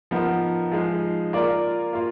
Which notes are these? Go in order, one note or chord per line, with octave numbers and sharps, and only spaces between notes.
F3 B3 D#4 A#4
F3 G#3 D#4
A#3 F4 A#4 D5
A#3 F4